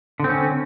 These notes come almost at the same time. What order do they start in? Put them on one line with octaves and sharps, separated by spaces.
D3 C4 C#4